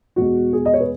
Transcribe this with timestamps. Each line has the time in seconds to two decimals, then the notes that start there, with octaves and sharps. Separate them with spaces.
0.16 E2 B2 G#3 F#4
0.53 G#4
0.66 D#5
0.74 C#5
0.80 B4